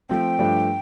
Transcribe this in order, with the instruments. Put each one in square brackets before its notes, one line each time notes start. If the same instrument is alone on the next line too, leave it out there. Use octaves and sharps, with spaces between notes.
[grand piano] F3 A3 C4 [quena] G5
[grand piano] G2 F3 A3 D4